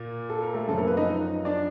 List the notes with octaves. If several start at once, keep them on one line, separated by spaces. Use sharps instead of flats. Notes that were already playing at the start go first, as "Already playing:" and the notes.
Already playing: A#2 A#3
A4
A#4
A3 A4
F#2 C#3 F3 A3 A4
A#3 A#4
B3 B4
D#4 D#5
D4 D5